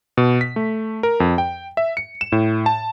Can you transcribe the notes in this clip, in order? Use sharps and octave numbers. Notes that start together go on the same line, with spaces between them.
B2
B6
A3
A#4
F2
G5
E5
C#7
E7
A2
A5